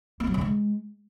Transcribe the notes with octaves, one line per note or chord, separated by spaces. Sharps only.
A#3
F#3
D3
G#3